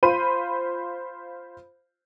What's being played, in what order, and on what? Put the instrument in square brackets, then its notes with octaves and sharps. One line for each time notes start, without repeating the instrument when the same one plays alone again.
[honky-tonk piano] F4 C5 B5 D#7